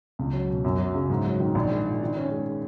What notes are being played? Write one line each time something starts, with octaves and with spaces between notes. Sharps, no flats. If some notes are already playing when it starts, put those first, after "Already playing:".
C#2
F#3
B2
F#2
F#3
C#3
G#2
F#3
D#3
A#1
G#3
A#2
D#3
C#4
G#3